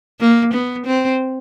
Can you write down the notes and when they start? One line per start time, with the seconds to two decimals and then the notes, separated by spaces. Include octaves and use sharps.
0.20 A#3
0.53 B3
0.86 C4